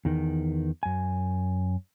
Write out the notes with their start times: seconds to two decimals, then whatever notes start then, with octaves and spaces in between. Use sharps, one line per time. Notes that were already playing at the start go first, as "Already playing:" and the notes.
0.05 E2 D#3
0.83 F#2 G#5